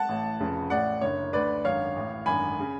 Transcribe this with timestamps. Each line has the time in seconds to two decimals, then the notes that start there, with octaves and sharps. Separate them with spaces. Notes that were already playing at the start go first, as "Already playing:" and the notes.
Already playing: F#5 A5
0.09 A1 A2
0.40 F1 F2 C#3
0.70 A1 A2 D5 F#5
1.01 F#1 F#2 D3 C#5
1.33 D2 D3 B4 D5
1.65 G#1 F#2 D3 C#5 F5
1.96 A1 A2
2.26 G#1 F#2 D3 G#5 B5
2.60 C#3